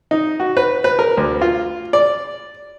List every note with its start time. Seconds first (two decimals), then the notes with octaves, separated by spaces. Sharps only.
0.11 D#4
0.40 F#4
0.57 B4
0.84 B4
0.99 A#4
1.17 D2
1.42 F4
1.93 D5